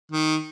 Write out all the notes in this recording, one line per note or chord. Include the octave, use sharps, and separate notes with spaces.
D#3